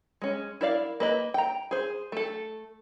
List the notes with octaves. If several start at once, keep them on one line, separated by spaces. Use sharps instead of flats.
G#3 C#4
E4 A#4 D5 F5
A#3 B4 D#5
G5 A#5
G#4 C5
A3 A4